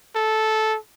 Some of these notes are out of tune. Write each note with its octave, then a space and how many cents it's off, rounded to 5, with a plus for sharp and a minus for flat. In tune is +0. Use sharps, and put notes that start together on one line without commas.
A4 -10